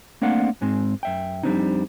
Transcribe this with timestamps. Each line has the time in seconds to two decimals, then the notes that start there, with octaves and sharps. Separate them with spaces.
0.22 A3 A#3 C4 D4 F5 F#5
0.61 G#2 G#3 C4
1.03 F#2 E5 G5
1.43 F2 G3 A#3 C4 D4 D#4